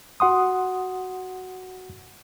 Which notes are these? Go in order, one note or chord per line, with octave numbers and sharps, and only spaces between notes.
F#4 F#5 C6 D#6